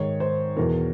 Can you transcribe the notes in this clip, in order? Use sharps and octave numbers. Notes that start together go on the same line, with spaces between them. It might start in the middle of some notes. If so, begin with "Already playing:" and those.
Already playing: G#2 D#3 C#5
C5
E2 B2 A#4